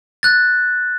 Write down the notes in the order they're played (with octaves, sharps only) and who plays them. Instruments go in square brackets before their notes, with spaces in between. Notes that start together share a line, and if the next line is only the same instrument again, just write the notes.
[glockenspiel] F#6 A6